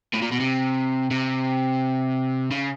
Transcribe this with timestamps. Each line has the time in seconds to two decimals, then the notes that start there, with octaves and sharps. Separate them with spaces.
0.14 A2
0.22 A#2
0.32 B2
0.40 C3
1.11 C3
2.51 C#3